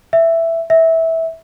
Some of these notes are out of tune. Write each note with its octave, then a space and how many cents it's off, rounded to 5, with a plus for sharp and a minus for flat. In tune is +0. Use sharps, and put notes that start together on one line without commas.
E5 +5
E5 -15